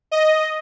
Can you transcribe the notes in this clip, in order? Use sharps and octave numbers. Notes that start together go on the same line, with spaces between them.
D#5